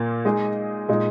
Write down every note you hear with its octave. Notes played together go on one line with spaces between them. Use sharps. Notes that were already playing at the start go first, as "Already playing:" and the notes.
Already playing: A#2 A#3 F4
G#3 D#4 G#4 D#5
A#2 G#3 D#4